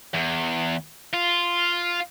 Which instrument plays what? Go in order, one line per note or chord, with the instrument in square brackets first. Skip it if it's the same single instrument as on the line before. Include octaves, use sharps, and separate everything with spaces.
[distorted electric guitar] E2
F4